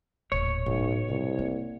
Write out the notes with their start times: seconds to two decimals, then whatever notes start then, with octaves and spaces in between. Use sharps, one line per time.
0.32 D#1 A2 C#5
0.66 B1 A2
1.09 C2 B2
1.39 A#3